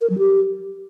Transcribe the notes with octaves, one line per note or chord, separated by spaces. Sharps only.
A#4
F#3
G4